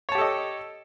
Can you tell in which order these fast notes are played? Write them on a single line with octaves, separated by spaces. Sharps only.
C#5 A5 G4 A4 D#5